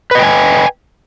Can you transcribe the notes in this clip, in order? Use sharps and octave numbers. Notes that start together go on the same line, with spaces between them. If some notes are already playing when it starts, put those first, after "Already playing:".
B4 D#5 G5 G#5